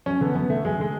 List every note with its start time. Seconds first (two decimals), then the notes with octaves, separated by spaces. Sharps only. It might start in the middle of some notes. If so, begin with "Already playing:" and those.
0.06 F#2 C#4
0.21 D3 B3
0.35 F#2 B3
0.50 D3 A3
0.64 F#2 G#3
0.79 D3 G#3